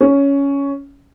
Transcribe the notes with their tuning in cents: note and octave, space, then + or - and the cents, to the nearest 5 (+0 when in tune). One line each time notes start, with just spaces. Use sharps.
C#4 +10